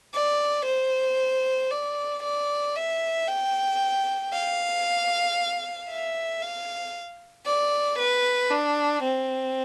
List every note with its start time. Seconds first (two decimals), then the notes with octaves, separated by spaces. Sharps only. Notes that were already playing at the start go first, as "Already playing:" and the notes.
0.14 D5
0.66 C5
1.71 D5
2.23 D5
2.76 E5
3.28 G5
4.33 F5
5.90 E5
6.42 F5
7.46 D5
7.99 B4
8.51 D4
9.03 C4